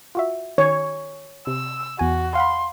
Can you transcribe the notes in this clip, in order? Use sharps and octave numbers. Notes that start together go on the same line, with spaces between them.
F4 F#4 E5
D#3 C#5
C3 E6
E2 F#4 G#5
F5 F#5 B5 C6